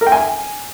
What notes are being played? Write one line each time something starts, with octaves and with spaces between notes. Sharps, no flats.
A#4
G5
G#5